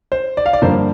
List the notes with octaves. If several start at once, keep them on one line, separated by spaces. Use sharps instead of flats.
C5
D5
F5
D5
G2 D3 F3 A#3 C5